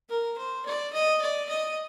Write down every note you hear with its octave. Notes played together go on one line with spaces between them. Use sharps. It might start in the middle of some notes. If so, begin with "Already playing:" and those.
A#4
C5
D5
D#5
D5
D#5